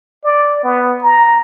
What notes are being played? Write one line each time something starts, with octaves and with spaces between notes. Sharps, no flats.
D5
B3
A#5